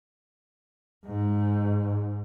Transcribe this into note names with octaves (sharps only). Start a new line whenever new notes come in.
G#2